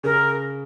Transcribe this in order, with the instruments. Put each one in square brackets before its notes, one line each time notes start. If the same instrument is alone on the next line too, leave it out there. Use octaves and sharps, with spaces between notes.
[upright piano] C#3 [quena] A#4